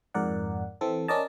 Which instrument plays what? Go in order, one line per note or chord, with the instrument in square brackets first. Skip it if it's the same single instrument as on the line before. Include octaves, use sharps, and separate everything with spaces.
[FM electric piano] F2 G#2 A#4 D5 F#5
E3 C4 A4
C#4 A#4 D5 D#5 A5